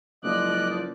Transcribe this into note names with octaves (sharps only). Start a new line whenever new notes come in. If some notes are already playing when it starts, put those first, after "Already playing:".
F#1 C#2 F3 D5 D#5 F#6